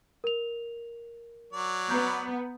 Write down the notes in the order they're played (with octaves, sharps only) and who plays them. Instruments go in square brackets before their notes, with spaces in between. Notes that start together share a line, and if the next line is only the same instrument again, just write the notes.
[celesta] A#4 F7
[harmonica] F#3 D5
[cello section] B3 [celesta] A#5 G6